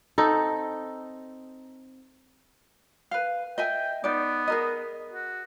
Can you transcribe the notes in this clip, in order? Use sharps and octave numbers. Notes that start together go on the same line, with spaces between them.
C4 D#4 A4
B4 F5
D#5 E5 G5 G#5
B3 D#4 D5
G#4 A#4 D#5
F#4